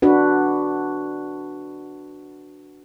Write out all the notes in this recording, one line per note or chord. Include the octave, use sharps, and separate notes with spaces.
D4 F#4 B4